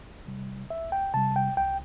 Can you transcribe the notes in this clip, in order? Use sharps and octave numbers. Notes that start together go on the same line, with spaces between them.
C3 G3
C2 E5
G5
C3 G3 A5
G5
C2 G5